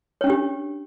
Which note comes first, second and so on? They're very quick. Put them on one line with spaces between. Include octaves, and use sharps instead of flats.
C#5 C#4 D4 G4